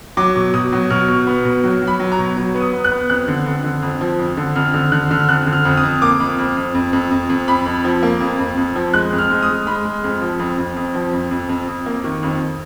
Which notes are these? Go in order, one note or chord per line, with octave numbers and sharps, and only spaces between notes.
F#3 D6
B2
B2 D#6
F#3
B2 F6
B2
B3
B2
F#3
F#3
B5
F#3
A#5
B2
F#3
B3
D#6
B3
F#6
B3
F2 F#6
D3
F2
D3
F2
F3
F2
D3
F2 F6
D3 F6
D3 F#6
D3 F6
F2 F#6
D3
F6
F2
D#6
F2
A#3 D6
F2
F2
F2
F2
F2
F2
F2
F2 B5
F2
F3
A#3
F2
F2
F2
F3
G#3 F#6
F2
F6
G#3
D#6
G#3
G#3 B5
G#3
F2
F3
F2
F2
F2
F3
F2
F2
F2
F2
A#3
D#3
F2